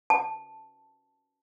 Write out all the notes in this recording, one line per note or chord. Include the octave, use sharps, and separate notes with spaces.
A5